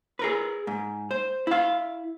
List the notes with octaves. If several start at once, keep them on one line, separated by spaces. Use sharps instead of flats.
G#4 A#4 B4
G#2
C5
E4 F5